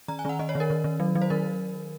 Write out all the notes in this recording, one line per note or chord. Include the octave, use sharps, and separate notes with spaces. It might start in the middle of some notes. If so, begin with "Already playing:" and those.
D#3 A#5
G#5
D#3 F#5
D#3 D#5
C#5
D#3
A#4
D#3
D#3
F#3
F#3
C5
D#3 A#4